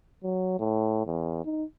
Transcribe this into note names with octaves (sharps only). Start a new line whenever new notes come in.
F#3
A2
E2
D#4